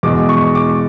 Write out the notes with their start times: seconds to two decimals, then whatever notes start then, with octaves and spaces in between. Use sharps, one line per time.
0.03 E2 B2 G#3 D6
0.29 C#6
0.55 D6